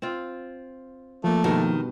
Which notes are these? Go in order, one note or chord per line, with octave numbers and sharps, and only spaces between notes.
C4 F4
F3 A3 A#3
G2 B2 D#3